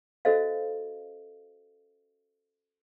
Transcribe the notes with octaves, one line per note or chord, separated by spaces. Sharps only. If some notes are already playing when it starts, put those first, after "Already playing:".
C#4 F#4 A4 C5 D#5 F5